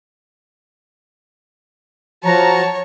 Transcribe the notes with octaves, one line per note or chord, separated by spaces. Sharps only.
F3 F#4 C#5 A5 A#5